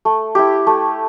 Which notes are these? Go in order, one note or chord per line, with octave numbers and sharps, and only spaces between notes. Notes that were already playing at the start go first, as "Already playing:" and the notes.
A3
E4 G4
A3